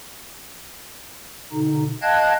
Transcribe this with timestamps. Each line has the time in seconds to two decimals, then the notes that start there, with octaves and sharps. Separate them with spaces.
1.53 B2 D3 D#4
2.02 D#5 F5 G5 A5 F#6 G#6